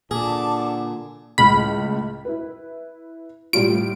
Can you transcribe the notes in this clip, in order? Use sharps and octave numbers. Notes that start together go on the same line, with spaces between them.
A#2 D3 G#4 A5 D6
C#2 A2 B5 F6
E4 B4
A2 G3 F4 D7